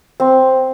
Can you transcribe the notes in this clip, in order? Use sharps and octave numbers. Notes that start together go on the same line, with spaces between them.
C4